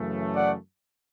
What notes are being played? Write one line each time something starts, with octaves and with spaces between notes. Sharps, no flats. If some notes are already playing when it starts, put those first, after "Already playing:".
Already playing: F#2 C#3 E3 A3
D5 F#5